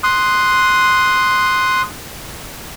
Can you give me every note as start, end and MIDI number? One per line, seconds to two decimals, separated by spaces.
0.03 1.82 84
0.03 1.82 87
0.03 1.82 90